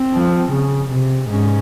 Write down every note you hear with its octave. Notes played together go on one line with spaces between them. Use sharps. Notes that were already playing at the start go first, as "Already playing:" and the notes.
Already playing: C4
F3
C#3
C3
G#2 C#4